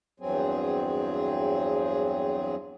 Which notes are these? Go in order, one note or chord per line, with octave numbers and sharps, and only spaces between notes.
E2 G2 F#3 C4 G#4